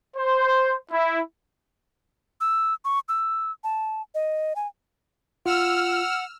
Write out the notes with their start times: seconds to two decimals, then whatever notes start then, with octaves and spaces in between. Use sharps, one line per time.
0.15 C5
0.91 E4
2.41 E6
2.85 C#6
3.09 E6
3.64 A5
4.15 D#5
4.56 G#5
5.46 F4 F#5 E6 F6